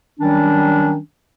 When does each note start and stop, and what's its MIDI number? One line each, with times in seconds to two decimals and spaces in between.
0.20 0.97 51
0.20 0.97 54
0.20 0.97 55
0.20 0.97 61
0.20 0.97 62